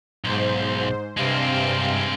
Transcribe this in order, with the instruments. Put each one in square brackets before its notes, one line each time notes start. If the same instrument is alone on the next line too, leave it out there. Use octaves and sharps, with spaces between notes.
[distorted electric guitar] B1 [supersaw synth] G#2 C5
[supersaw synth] G2 C3 F5 [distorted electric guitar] G#3 C4